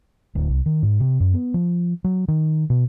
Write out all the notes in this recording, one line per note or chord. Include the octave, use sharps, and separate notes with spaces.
D1
C2
D#3
G#2
C3
F#2
B3
F3
F#3
D#3
B2